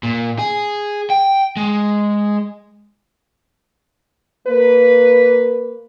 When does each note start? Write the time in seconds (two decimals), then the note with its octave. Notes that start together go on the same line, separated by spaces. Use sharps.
0.03 A#2
0.39 G#4
1.10 G5
1.57 G#3
4.48 A#3 B4